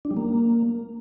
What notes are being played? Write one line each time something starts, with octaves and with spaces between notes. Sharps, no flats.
D4
G3
A#3